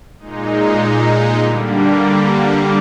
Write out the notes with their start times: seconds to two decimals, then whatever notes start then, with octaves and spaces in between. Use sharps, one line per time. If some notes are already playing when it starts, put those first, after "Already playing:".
0.19 A#2 G#3 D#4
1.40 D3 G3 A#3